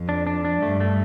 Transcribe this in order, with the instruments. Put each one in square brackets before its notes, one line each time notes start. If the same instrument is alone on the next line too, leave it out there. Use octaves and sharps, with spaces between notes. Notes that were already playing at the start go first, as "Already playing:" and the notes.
Already playing: [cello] F2
[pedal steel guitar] D4
D4
D4
[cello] G2 [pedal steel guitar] A3
[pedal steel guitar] A3